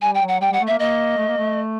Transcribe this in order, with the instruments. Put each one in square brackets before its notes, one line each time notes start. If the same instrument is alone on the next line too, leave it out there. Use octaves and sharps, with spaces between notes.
[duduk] G3 [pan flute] G#5
[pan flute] G5
[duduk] F#3
[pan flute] F#5
[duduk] G3 [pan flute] G5
[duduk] G3 [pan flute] F#5
[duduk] A3
[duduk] A#3 [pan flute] E5
[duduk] A#3 [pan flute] D#5
[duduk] A3
A#3
A3